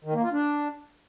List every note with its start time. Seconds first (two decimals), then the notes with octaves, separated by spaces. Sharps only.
0.05 D#3
0.14 A#3
0.23 F4
0.32 D4